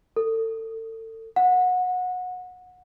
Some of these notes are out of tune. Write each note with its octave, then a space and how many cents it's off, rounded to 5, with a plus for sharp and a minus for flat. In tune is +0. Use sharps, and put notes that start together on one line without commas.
A4 +30
F#5 -25